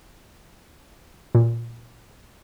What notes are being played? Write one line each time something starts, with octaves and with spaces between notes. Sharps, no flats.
A#2